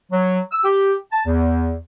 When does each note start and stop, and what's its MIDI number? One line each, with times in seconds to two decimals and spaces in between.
0.12 0.40 54
0.51 0.63 88
0.63 0.93 67
1.11 1.25 81
1.26 1.76 40